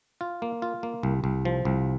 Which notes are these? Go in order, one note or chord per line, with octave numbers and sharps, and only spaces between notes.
F4
A#3
F4
A#3
C2
C2
F3
C2